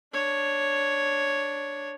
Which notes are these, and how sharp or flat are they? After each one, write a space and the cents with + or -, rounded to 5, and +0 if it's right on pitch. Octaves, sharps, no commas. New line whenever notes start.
D4 +0 C#5 +0